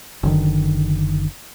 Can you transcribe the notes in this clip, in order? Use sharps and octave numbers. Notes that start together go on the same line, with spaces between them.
F#1 D3 D#3